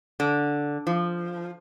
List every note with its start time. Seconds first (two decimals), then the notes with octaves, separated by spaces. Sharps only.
0.20 D3
0.87 F3